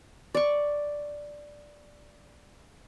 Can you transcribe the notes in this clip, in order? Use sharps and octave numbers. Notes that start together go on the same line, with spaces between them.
D5 C#6